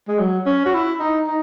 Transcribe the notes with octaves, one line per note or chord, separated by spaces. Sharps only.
G#3
F#3
C#4
F#4
E4
D#4
D#4